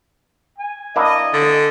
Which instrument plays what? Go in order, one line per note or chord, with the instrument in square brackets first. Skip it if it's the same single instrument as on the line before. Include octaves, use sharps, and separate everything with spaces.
[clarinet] G#5
[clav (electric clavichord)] A#3 D4 E4 [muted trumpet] D#5
[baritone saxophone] D3